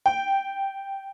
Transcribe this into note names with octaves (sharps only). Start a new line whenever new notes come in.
G5